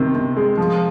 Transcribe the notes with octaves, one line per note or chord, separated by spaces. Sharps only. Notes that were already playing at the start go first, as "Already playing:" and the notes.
Already playing: C3 D#3
C3
G#3
F3